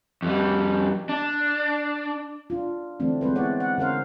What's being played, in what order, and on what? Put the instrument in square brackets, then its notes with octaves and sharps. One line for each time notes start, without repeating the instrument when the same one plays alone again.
[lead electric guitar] F2 G3
D4
[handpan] D4 F4
D3 E3 A3 C4 D4
G#3 C4 B4 C5
B3 E4 C#5 D5 F#5
F#5
D3 C#4 A#4 C5 F5